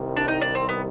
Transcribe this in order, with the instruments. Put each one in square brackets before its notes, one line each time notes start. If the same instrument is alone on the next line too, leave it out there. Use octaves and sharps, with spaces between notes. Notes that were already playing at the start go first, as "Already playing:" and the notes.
Already playing: [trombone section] C2 C3 D#3 G3
[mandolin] D4
D#4
D4
C4
B3